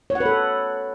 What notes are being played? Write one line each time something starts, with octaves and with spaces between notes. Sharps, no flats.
C#5
F#5
B4
A4